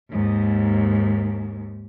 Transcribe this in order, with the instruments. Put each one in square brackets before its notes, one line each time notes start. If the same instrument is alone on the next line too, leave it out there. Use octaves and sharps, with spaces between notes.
[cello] D#2 G#2